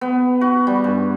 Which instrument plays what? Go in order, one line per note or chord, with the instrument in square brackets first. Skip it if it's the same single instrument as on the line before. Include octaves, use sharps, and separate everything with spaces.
[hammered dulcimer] B3
F#4
G3
G2